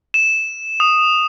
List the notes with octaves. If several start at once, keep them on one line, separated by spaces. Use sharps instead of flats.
E7
D#6